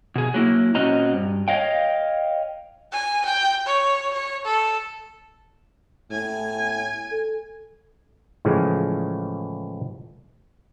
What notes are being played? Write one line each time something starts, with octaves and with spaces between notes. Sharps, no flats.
B2 G#4
F#3 A#3 E4
A#2 C4 C#4 F#4 D#5 A#5
G2
C#5 D#5 F5 G5
G#5
G5
C#5
C#5
A4
A2 G#5
A4
A2 C#3 E3 F3 G#3